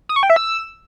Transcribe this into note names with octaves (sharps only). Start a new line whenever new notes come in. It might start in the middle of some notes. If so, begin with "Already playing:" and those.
D#6
C#6
G5
E5
E6